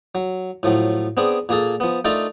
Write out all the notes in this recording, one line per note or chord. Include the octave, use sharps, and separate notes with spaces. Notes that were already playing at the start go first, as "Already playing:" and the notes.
F#3
A2 F3 F#3
B3 C4 D4 G#4
A#2 A#3 G#4 A4
F3 B3
A3 D4 D#4 F4 A4 A#4